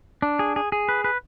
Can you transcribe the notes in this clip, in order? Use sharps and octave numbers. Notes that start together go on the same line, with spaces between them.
D4
G#4
G#4
G#4
B4
B4